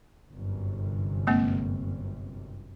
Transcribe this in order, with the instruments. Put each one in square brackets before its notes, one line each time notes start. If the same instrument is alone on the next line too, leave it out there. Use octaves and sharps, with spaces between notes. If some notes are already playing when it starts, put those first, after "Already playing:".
[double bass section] G1 F#2 C3
[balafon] G#3 A#3 C4